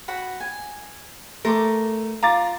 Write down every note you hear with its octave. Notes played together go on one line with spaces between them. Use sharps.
F#4 F#5 B5
G#5
A3 A#4 C6 D6
F4 A#5 D6 A6